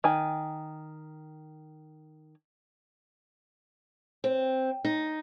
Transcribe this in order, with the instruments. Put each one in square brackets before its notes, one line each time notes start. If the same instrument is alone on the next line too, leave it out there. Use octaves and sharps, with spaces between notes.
[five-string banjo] D#3 G#5
[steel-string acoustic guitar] C4
D#4